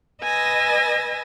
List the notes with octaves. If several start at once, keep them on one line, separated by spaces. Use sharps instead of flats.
B4 D#5 G#5 E6 A#6